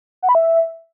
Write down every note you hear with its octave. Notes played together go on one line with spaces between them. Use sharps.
F#5
B5
E5